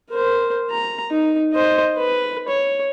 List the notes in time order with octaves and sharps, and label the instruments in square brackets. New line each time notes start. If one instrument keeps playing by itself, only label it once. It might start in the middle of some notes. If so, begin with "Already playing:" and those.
[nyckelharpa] A#4 C5
A#5
D#4
C5 D#5
B4
C#5